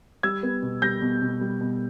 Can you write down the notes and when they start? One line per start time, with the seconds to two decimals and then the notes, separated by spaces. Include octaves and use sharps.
0.23 G3 E6 G#6
0.43 B3
0.62 B2
0.82 G3 G6 A#6
1.02 B2
1.22 B2
1.41 G3
1.61 B2